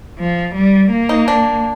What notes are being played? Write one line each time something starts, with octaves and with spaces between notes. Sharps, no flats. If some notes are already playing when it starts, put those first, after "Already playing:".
F3
G3
A#3
D#4
D4